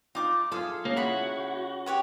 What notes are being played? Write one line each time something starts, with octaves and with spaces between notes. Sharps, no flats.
D#4 F4 D6
F4 G#4 A4 E5 F5
C#3 A#3
E4 F#4 B5
G4 C#5 F#5